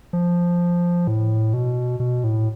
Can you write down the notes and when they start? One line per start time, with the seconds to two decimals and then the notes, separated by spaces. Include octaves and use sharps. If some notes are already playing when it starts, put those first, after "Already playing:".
0.13 F3
1.07 A2
1.54 B2
2.00 B2
2.24 A2